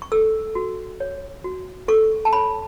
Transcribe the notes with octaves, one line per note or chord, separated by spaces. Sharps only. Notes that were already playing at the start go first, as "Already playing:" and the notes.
C#6
A4 E6
F#4
C#5
F#4
A4 C#6
A5
C#5 B5